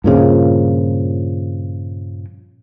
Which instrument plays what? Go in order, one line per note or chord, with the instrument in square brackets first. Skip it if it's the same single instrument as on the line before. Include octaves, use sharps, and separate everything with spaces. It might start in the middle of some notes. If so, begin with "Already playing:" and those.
[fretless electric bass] G2 A#2 C#3 F3